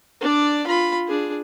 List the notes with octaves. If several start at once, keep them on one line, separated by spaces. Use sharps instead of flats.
D4 D5
F4 B5
D4 G#4